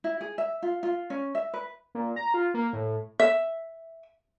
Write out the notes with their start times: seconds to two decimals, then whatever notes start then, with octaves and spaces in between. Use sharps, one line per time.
0.04 E4
0.21 G#4
0.38 E5
0.62 F4
0.83 F4
1.10 C#4
1.35 E5
1.54 B4
1.95 A#2
2.16 A#5
2.34 F4
2.54 A#3
2.73 A2
3.20 E5